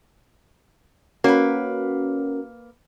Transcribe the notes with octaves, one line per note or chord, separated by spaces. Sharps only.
A#3 C#4 F#4 A#4 B4